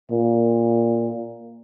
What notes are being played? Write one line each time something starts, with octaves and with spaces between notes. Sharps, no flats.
A#2